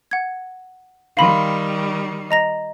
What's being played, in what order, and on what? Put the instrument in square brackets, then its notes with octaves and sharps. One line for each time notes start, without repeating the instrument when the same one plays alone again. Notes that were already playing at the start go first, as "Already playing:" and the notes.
[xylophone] F#5 G#6
[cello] D#3 G3 [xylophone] F5 B5 C6
[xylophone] D#5 A#5 A#6